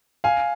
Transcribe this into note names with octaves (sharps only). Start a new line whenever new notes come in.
F5 G#5